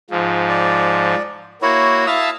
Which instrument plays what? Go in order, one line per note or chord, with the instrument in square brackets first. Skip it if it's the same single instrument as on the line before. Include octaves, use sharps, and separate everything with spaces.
[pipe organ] G#2 F3
[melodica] D5
[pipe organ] A#3 F#4 [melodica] E4 C#5
[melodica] E4 D#6 E6 [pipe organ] E5 F5 A5